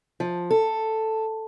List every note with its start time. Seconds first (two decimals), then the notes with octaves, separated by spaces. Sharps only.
0.20 F3
0.50 A4